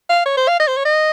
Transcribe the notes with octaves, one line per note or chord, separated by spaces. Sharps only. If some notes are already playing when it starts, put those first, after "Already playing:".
F5
C#5
C5
F5
D#5
C5
C#5
D#5